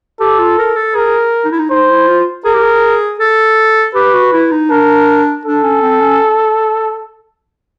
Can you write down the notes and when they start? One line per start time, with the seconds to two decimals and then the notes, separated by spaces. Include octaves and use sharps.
0.20 G4 A4
0.39 F4
0.58 A#4
0.76 A4
0.95 G#4 A#4
1.45 D#4
1.52 E4
1.59 D#4
1.70 D#4 C5
1.89 E4
2.08 F4
2.44 G#4 A#4
2.54 G4
2.63 G#4
3.19 A4
3.95 G4 B4
4.14 F#4
4.33 E4
4.51 D#4
4.70 D4 A#4
5.45 D4 A4
5.63 C#4
5.82 C4
6.01 C#4